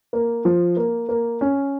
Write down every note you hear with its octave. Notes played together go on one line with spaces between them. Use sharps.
A#3
F3
A#3
A#3
C#4